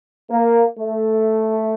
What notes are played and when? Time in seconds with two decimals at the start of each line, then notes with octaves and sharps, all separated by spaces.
0.31 A#3
0.78 A3